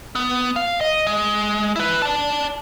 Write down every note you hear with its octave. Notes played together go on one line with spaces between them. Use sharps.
B3
F5
D#5
G#3
E4 B4
D5 A5